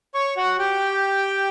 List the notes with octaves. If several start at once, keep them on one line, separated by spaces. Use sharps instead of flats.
C#5 C#6
F#4 F#5
G4 G5